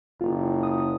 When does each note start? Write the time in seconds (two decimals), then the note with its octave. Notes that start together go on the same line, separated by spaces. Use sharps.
0.21 F#1 F4
0.63 D#6